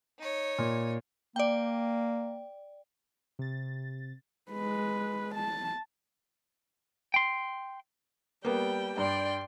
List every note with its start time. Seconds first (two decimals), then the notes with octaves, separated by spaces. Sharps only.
0.19 D#4 C#5
0.58 A#2
1.36 A#3 D5 G5
3.39 C3 A6
4.52 G#3 B4
5.35 A5
7.14 G5 C6
8.45 G3 A#3 B3 G5
8.97 G2 D5 G5 C6